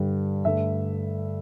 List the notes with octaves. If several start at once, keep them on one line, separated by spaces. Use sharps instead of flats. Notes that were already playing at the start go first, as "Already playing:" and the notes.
Already playing: G2 D3 G3
G2 D3 A3 E5